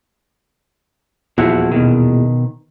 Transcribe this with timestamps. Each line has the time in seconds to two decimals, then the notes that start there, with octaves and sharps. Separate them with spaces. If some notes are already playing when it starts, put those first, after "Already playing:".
1.38 D#1 E2 F3 E4 F#4
1.72 B2 D#3